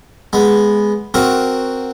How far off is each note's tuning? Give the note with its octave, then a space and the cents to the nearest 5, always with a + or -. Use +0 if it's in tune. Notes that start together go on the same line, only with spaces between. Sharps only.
G#3 +0 B3 +0
C4 +0 F#4 +0 A#4 +0